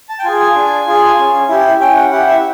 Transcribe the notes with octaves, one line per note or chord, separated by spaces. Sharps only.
A5
G5
F4 G#4 G#5
G#5
D4
F4 G#4
C#4
E4 G4
C#4 G5
F#5
E4 G4 F#5
E5